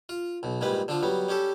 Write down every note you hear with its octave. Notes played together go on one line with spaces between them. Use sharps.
F4
B1 B2
A#1 G#2 G3 G#3 B4
D3 F3 D4 F4
F#3 G3 B3
G3 C#4 G4 A4